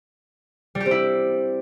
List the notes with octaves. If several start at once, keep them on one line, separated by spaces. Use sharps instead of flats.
G3
G4
C4
E4